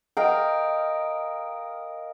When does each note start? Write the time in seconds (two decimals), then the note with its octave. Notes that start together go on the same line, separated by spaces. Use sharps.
0.17 A#4 D#5 F5 G5